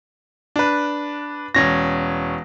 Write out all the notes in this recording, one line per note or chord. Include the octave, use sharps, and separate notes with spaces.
D4 B4
E1 C#4 A#6